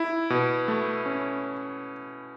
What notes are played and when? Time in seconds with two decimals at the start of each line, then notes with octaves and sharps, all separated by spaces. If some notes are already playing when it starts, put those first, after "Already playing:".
Already playing: E4
0.30 B2
0.68 A3
1.06 C#4